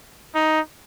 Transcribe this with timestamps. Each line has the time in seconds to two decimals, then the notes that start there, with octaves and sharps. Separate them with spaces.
0.35 D#4